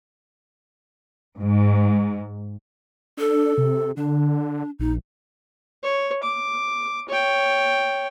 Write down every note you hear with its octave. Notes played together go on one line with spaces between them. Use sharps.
G#2
D4 A4
C3
D3 D4
A#1 D#4
C#5
D6
C#5 G5